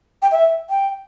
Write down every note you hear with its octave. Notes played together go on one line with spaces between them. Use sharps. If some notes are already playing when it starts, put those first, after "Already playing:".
G5
E5
G5